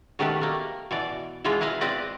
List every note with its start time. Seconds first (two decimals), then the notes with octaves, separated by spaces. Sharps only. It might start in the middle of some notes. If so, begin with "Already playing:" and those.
0.19 B2 D#3 A3 G4 B4
0.41 A3 A#3
0.91 B2 E3 D5
1.44 B2 E3 G#3 F4
1.61 E4 B4 D#5 F5
1.81 C4 B4 D5 D#5